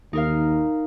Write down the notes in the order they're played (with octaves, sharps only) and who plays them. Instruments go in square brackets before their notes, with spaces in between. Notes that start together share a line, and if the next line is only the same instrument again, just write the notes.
[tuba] D#2 [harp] D#4 A#4 F5